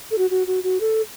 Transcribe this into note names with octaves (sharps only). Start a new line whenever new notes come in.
A4
F#4
F#4
F#4
F#4
A4